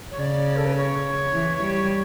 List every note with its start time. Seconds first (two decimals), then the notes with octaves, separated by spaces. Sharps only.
0.11 C#5
0.19 C#3 D5
0.56 A4
0.66 B4
0.77 C#5
1.34 E3
1.63 G3